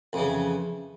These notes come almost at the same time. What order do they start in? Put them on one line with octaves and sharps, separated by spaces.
F2 E3 C#3